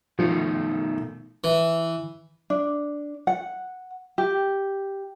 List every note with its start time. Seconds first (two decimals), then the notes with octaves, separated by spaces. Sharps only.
0.19 B2 D#3 F3 A3
1.44 E3
2.50 D4
3.27 F#5
4.18 G4